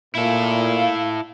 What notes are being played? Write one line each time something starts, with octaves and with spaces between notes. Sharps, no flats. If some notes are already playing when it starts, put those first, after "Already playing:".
A#2 E4 A4 F5